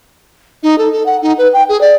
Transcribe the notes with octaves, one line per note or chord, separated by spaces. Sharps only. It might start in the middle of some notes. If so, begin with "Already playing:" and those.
D#4
A4
A4
F#5
D#4
B4
G5
G#4
D5